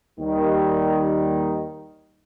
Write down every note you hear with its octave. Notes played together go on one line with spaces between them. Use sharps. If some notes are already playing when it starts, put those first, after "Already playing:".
D#2 D#3 G3